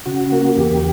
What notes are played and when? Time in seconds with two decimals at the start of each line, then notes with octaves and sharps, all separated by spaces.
0.06 C#3 F#4
0.32 A#3
0.57 E2 G4